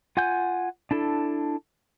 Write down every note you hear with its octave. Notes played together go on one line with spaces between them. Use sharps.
F4 F#5 G#5 G6
D4 E4 A4